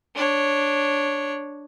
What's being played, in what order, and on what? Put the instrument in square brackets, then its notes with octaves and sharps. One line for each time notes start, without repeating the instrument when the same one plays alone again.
[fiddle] D4 C#5